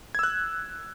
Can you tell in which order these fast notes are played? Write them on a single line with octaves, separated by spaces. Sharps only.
G#6 E6 F#6